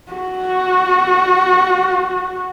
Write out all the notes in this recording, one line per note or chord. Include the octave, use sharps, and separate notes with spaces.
F#4